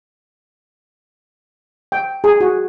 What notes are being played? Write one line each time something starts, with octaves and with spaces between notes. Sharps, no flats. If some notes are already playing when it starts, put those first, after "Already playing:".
G5
G#4
F#4